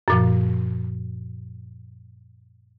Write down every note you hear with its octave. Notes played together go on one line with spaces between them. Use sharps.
F#2 A#2 F3